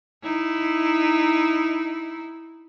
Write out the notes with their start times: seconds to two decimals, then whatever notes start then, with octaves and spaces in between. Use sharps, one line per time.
0.23 D#4 E4